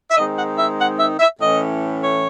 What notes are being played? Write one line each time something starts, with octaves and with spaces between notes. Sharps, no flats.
E5
D#3 G#3 C4 D#4 D#5
F#5
E5
F#5
E5
E5
A2 E3 A3 C#4 D#5
C#5